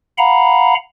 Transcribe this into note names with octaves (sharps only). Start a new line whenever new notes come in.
F5 F#5 A#5 B5